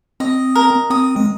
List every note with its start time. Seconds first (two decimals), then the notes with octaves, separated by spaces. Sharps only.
0.20 C4 D#5
0.55 A#4
0.90 C4 D#6
1.16 G#3